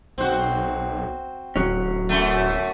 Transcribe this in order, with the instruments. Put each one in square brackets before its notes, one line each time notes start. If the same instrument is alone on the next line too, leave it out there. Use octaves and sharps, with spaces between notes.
[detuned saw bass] B1 [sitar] C4 F#4
[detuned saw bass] D1 [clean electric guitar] F#3 C#4
[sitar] F#2 A3